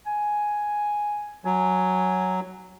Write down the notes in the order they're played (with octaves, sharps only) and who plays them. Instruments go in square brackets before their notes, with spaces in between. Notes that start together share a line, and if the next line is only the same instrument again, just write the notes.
[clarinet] G#5
[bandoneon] F#3 [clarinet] G#5